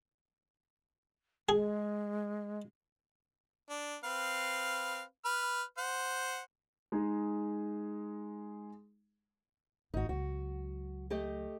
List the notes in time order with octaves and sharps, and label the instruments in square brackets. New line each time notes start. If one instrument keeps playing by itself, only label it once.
[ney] G#3 [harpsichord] G#4
[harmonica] D4
C4 B4 F5
B4 F6
C5 F#5
[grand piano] G#3 D#4 G#4
[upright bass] G#1 [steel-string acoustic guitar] D#4 F#4
[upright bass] C#2 F#3 [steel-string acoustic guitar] F#4
[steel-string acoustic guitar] A3 G4 D#5